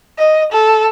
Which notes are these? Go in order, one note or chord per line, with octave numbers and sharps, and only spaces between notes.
D#5
A4